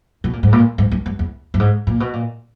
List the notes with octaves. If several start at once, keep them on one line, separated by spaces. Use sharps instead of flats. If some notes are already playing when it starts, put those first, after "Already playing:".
B2
A#2
G#2
A#2
G#2
G2
G2
E2
G2
G#2
A#2
B2
A#2